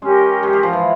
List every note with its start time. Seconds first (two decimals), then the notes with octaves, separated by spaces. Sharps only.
0.02 G#3 C#4 G4 A#4
0.43 G#3
0.53 G#3
0.63 F3
0.73 E3